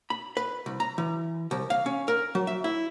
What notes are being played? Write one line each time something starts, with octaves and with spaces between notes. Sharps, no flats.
B5
B4
C2
A#5
E3
C2
F5
C#4
A#4
F#3
E5
E4